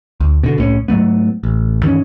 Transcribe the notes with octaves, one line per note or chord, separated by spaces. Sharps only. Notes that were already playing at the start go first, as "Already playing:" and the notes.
D2
B2 D3
C2 A2 G#3 C#4
G#2 F#3 A3 B3
A1
G2 D#3 E3 C#4